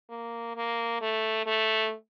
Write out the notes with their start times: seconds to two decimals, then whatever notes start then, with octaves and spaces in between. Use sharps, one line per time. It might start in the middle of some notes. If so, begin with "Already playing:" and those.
0.10 A#3
0.56 A#3
1.01 A3
1.46 A3